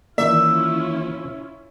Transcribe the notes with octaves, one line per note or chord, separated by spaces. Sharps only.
D#3 E3 A#3 C#4 E4 F4 D5 E5